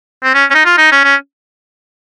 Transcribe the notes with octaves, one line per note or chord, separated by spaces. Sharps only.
C4
C#4
C#4
D#4
F4
D#4
C#4
C#4